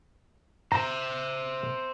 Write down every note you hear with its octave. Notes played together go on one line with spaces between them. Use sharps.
C5 E5 A#5